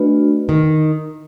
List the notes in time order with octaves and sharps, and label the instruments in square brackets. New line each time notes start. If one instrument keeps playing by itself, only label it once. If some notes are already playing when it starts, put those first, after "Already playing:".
Already playing: [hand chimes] A3 D4 F#4 B4
[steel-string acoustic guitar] D#3